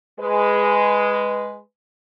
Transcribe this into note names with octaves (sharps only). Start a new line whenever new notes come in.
G#3 B4